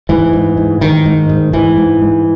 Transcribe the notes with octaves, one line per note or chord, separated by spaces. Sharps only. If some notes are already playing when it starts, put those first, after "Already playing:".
G#2 E3
G#2
G#2
G#2 D#3
G#2
G#2
G#2 E3
G#2
G#2